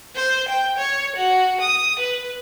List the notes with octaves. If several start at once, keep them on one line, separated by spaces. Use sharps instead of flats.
C5
G5
C#5
F#4
D#6
B4